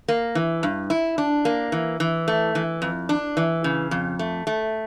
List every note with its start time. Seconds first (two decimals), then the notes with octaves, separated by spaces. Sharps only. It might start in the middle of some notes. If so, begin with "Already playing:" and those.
0.08 A#3
0.35 E3
0.63 G2
0.90 E4
1.18 D4
1.45 A#3
1.72 E3
2.00 E3
2.28 A3
2.55 E3
2.82 F2
3.09 D4
3.37 E3
3.64 C#3
3.91 F2
4.19 A3
4.47 A3